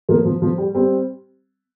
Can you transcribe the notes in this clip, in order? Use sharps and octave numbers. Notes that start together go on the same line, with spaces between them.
F3 A#3
F3
F3
G3
G3 C4